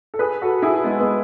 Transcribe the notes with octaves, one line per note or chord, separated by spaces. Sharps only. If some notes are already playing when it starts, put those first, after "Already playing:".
A4
G#4 B4
F#4 A4
E4 G#4
G#3 B3
G#3 B3